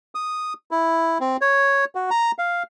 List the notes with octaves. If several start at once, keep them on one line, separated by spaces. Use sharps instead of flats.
D#6
E4
C4
C#5
F#4
A#5
F5